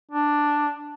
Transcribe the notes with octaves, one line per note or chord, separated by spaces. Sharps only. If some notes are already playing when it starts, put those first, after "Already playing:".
D4